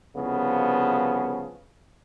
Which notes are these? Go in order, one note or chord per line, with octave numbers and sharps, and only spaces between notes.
C2 C#3 F3 B3